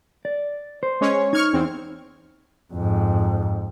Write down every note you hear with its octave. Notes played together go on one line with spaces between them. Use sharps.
D5
C5
G#3 C#4 C#5
D#4 C#6 F6 G#6
E2 C4
F2 G#2